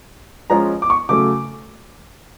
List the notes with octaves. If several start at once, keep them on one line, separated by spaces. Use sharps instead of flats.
F3 G#3 C#4 F4 A#5
D6
C#6
C#3 F#3 A3 D6